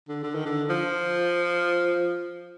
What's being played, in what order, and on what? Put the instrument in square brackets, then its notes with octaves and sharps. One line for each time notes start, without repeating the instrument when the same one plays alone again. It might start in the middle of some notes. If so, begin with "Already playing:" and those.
[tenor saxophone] D3
D3
D#3
D3
F3